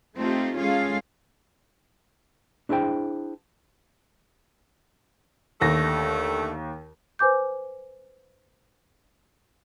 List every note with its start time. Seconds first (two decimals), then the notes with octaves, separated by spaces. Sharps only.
0.16 A3 C4 D#4 F4 G4
0.58 G#3 C#4 F4 G#4 A4 F5
2.69 D4 E4 G#4 C5 G5
5.62 D#2 D3 A3 A#6
7.19 B4 C5 G#5 D6 G6